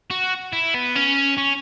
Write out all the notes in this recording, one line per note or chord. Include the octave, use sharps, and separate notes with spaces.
F#4
E4
B3
C#4
C#4